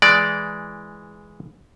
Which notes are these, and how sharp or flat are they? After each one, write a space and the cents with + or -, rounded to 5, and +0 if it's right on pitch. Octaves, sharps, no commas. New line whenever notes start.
E3 +0 G#3 +0 D5 +0